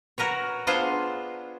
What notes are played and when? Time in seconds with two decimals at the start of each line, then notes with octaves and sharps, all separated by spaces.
0.18 F#4 A#4 B4 C#5
0.67 B3 D4 F4 G#4 C5